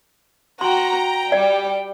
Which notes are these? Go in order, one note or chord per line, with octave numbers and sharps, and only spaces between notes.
F#4 G5 A#5 C6
G5
G3 D5